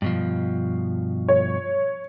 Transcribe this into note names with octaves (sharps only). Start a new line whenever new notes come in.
G2 B2 F3
C#5